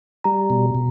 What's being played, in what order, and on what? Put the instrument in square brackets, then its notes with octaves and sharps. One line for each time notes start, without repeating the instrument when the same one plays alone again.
[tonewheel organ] G3 [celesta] A#5
[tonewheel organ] B2
B2